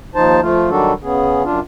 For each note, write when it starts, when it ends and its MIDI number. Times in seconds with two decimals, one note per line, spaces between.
0.15 0.40 39
0.15 0.40 53
0.15 0.40 63
0.15 0.40 72
0.15 0.40 81
0.41 0.69 53
0.41 0.69 57
0.41 0.69 65
0.70 0.93 51
0.70 0.93 54
0.70 0.93 55
0.70 0.93 62
0.70 0.93 66
0.70 0.93 69
1.03 1.43 49
1.03 1.43 59
1.03 1.43 61
1.03 1.43 68
1.44 1.60 42
1.44 1.60 62
1.44 1.60 65